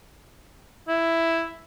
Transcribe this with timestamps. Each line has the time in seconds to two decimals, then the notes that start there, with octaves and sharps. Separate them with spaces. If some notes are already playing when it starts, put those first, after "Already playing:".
0.88 E4